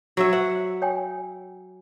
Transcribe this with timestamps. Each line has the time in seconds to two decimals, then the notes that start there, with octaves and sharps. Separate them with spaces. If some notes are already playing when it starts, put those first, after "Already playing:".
0.17 F#3 C#5 E5
0.33 C5 E5 F#5
0.82 C#5 G5 G#5